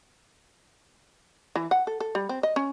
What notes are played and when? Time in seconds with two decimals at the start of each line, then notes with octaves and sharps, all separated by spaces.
1.56 E3
1.71 F#5
1.87 A4
2.00 A4
2.15 G3
2.29 C4
2.43 D#5
2.56 C#4